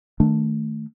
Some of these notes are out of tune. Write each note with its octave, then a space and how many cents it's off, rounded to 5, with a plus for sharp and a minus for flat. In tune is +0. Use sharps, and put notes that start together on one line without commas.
D#3 +0 A3 +0 D4 +0